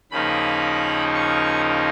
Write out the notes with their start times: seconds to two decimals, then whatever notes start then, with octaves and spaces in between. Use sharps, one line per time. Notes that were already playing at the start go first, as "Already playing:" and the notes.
0.11 D#2 C#3 F3 A#3 D#4 B5
1.15 C#6